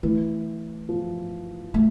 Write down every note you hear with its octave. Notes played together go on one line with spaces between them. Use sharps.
E3 A3
F3
A3